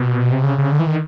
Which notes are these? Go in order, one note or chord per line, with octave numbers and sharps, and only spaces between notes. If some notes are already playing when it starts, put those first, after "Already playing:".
Already playing: B2
C3
C#3
C#3
D3
E3
D#3